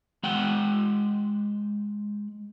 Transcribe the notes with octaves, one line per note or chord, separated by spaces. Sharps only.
G#3 F#5 G5